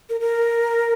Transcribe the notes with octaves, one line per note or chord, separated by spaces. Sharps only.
A#4
A#4